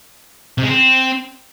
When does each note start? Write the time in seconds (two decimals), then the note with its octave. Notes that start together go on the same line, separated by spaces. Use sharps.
0.58 C3
0.63 G#3
0.68 C4